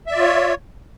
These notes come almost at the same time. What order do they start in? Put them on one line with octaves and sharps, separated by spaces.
E5 D5 F4 C#5